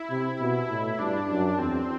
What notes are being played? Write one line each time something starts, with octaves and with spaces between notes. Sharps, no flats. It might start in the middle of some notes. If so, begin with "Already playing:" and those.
Already playing: E4
C3
B2
A2
G2 D4
F#2
E2 C4